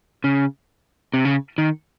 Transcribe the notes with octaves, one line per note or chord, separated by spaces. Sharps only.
C#3
C3
C#3
D#3